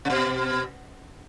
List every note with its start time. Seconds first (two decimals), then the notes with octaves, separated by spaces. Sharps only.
0.05 C3
0.10 B2